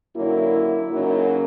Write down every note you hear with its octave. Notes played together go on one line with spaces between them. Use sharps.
F#2 D3 F#3 A#3 E4
F#2 C#3 F#3 A#3 D#4 E4